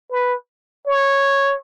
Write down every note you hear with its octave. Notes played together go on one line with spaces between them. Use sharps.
B4
C#5